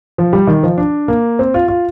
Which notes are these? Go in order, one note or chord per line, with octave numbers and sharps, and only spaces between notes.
F3
G3
D#3
F3
D4
A#3
C4
F4
F4